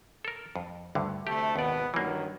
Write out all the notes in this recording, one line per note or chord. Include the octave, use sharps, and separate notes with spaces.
A4 A#4
F2
D2 G2 D3
D2 C3 A3 G4
G#1 D#2 B2 B3 D5
G2 D#3 E3 F#3 A#3